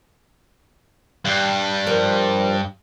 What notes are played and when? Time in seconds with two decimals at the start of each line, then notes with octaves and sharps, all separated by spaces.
1.25 G2
1.87 F3 A#4